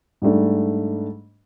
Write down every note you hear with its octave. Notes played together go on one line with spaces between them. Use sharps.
G#2 G3 A3 D4